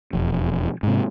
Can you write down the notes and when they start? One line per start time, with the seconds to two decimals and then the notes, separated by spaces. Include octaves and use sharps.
0.13 E1 F2
0.83 G#2 C3